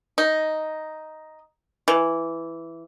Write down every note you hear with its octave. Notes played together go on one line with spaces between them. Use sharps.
D#4
E3